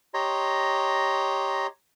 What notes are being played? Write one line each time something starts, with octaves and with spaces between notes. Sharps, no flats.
G4 C#5 D#5 A#5 C6